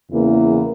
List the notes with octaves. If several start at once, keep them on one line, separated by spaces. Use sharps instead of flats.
E2 C#3 E3 A#3